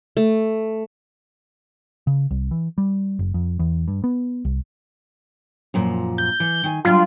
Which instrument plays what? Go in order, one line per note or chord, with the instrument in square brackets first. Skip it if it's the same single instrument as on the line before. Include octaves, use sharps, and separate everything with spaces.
[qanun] A3
[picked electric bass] C#3
C2
E3
G3
F#1
F2
E2
G2
B3
C2
[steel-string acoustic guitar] F#2 A#2 F3
[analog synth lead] G6
[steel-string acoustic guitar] E3
D#3 G#5
[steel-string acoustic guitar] F#3 G3 D4 [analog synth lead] F4